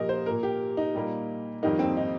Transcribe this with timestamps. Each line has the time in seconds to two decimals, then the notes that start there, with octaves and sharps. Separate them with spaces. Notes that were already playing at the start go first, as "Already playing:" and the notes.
Already playing: A#2 F3 A#3 G4 A#4 D#5
0.09 C5
0.26 A#2 A#3 A#4
0.43 G4
0.77 D#4
0.94 A#2 G3 A#3
1.63 F2 D#3 G3 A#3 D#4
1.79 C4
1.97 D#4